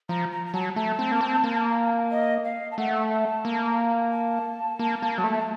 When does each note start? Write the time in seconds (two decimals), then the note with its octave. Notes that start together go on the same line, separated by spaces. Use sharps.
0.09 F3 A#5
0.31 A#5
0.46 A#5
0.54 F#3 A5
0.76 A3 A5
0.99 C4
1.12 A#3
1.21 C4
1.44 A#3
2.11 D#5
2.44 F5
2.71 A5
2.78 A3 F#5
3.11 A5
3.45 A#3
4.12 A5
4.79 A#3
5.02 A#3
5.18 F#3
5.24 A3